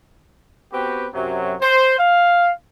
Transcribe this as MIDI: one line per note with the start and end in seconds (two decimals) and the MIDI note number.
0.72 1.06 59
0.72 1.06 60
0.72 1.06 66
0.72 1.06 67
0.72 1.06 71
1.13 1.55 42
1.13 1.55 48
1.13 1.55 54
1.61 1.98 72
1.98 2.51 77